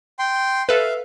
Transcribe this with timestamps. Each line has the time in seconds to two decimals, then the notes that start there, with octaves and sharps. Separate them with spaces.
0.19 G5 C6
0.69 A4 B4 E5 F5